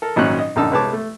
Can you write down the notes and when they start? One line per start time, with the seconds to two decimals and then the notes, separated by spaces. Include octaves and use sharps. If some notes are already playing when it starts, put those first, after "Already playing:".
0.02 A4 A#4
0.16 G#1 A#2 F#3 C#4 F#6
0.39 D#5
0.56 A#1 F#2 D3 D#4 A5 E6
0.71 C2 G#3 B4 C#5 A5 D6
0.93 A3